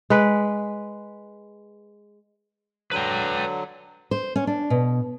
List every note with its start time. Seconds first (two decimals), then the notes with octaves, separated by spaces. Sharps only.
0.10 G#3 B4
2.91 D3 F#3 B4 G5
4.11 C5
4.36 C#4
4.47 D4
4.70 B2